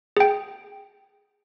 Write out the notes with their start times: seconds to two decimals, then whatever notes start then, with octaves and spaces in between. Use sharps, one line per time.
0.17 G#4 G5